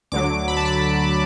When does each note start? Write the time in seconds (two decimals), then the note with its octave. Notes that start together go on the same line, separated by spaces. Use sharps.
0.12 D2 D3 F#3 D6
0.48 B5
0.57 A5
0.65 B5